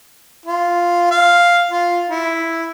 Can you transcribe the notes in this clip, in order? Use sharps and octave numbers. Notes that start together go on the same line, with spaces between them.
F4
F5
F4
E4